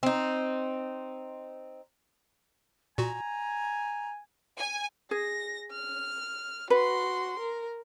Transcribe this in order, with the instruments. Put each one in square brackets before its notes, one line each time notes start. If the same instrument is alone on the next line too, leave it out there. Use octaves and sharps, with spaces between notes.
[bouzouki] C4 D#4
[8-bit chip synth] A#2 F#4 [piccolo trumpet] G#5 [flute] A#5
[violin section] G#5
[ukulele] G#4 [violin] A#6
[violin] F6
[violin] F#4 C6 [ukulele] B4
[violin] A#4